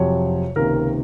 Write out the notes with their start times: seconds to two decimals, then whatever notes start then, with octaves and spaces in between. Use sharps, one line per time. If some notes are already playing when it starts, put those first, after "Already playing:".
Already playing: F2 C3 F#3 C#5
0.56 C#2 C3 D#3 A#3 A#4